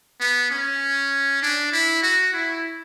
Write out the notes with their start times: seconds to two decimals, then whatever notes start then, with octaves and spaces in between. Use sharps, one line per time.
0.21 B3
0.51 C#4
1.43 D4
1.72 E4
2.03 F#4
2.34 E4